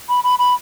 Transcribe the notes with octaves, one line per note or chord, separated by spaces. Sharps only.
B5
B5
B5